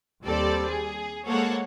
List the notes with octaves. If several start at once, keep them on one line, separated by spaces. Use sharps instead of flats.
D#2 G3 C4 A4 D5
G#4
G#3 A#3 A4 C5 C#5 F#5